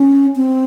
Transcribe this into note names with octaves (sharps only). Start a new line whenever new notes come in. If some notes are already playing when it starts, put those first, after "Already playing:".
Already playing: C#4
C4